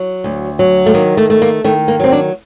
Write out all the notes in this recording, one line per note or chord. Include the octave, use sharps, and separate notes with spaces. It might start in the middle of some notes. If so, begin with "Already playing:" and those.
Already playing: F#3
D2
F#3
A3
D#3 A#3
A3
A3
A#3
D#3 A3
A#3
F#3 C4
D4